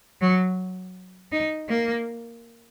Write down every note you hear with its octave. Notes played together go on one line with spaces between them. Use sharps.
F#3
D#4
A#3